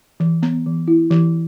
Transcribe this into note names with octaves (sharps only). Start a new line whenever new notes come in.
E3
B3
E3
E4
E3